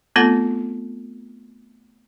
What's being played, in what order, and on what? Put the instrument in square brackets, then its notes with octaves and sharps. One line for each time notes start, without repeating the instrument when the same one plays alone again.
[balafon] A3 B3 C4 F4 A4 F#5